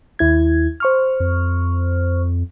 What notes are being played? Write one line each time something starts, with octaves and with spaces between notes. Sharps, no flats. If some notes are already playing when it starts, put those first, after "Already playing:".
D#2 E4 G#6
C5 C#6 F6
F2